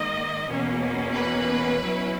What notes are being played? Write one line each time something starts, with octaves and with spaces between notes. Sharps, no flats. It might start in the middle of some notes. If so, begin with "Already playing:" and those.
Already playing: G#2 D#3 A#3 D#5
E2 B2 A#3 C#4
B4
B2 F#3 C#4 E4